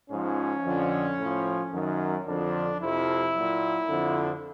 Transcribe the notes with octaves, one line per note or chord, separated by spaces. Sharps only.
G#2 F3 C#4
F2 D3 F3
A2 F3
F#2 D#3 F#3
F2 D3 F3 D4
F2 C3 F3 E4
A#2 F#3
F2 D3 F3